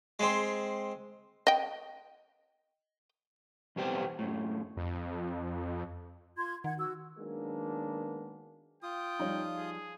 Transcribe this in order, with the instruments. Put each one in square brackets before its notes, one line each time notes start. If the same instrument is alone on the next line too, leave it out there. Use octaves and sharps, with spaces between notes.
[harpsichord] G#3 C4
[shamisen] D#5 G5
[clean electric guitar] B1 E2 G3 B3 C5 G5
F#2 A2
[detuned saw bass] F2
[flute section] F4 C6 G#6
[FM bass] D#3 [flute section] F#5 G#6
[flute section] F#4 E6
[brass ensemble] D#3 F#3 G#3 A#3 B3 D4
[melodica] F4 D#6 [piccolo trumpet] G5
[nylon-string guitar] F3 G3 [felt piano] D#4 C#5
[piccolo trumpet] G#4